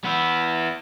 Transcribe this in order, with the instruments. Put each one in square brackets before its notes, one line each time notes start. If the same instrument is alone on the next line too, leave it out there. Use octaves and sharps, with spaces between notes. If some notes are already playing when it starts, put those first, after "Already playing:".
[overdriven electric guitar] B3 E4